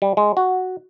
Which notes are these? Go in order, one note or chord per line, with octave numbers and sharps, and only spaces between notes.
G3
G#3
F#4